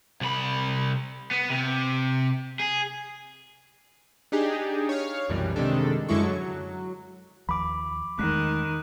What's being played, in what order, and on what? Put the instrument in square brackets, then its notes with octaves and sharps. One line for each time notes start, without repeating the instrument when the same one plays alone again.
[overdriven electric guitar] C2 B5
B3
C3
G#4
[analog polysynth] D4 D#4 G4 G#4
C#5 F5
C2 F#2 B2 E3 G3
C3 D#3 G3 G#3 D4 A4
F#2 D3 G#3 E4 A4 C#6
F#3
[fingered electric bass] D#2 F3 [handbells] B5 D6
[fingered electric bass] E2 G#3 A3 [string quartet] D#3 [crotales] F#6